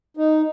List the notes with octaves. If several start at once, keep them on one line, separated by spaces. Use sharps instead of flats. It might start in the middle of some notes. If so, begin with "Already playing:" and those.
D#4